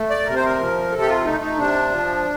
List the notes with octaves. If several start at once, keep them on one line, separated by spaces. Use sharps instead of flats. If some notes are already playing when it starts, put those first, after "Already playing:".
Already playing: A3
D5
C3 A#4
C5
A#4
F3
C3 A4
G4
F4
A3 D#4
D#4
C3 D4
F3